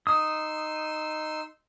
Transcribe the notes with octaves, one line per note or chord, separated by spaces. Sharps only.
D#4 C6 D#6 E6